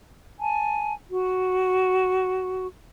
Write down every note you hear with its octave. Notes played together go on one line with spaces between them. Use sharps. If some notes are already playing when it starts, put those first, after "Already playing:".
G#5 A5
F#4